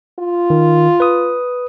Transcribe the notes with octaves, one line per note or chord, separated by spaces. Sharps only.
F4
D#3
B4 D#6